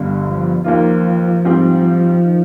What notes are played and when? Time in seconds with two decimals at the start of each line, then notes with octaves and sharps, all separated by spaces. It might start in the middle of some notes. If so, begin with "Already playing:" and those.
Already playing: G1 G2 D3 G3
0.25 F3
0.64 D#2 D#3 F3 A#3 F4
1.45 G#2 G3 C4 G4
2.25 D#3